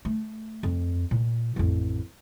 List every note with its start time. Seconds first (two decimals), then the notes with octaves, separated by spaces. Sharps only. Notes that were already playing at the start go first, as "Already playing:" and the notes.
0.05 A3
0.63 F2
1.11 A#2
1.56 A1 F2